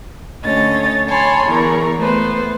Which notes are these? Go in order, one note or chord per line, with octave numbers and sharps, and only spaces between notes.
D2 C#4 C#5 D#5 A6
C#5 G#5 A5 B5 C6
E2 E3 A#4 C#6
A3 B3 B4 C5